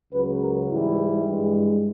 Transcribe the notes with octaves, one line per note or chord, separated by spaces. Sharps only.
C#2 C#3 F#3 B4
A#4
G#2 E3 G3 E4
G2 E3 G#3